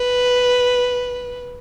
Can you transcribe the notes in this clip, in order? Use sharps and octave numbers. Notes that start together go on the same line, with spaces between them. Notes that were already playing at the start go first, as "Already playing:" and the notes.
Already playing: B4